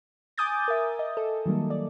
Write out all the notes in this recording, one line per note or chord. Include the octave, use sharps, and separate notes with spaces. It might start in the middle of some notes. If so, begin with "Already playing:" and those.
G#5 D6 D#6 G6 A6
A#4 E5
D#5
A4
D#3 F#3 G3 A#3
D5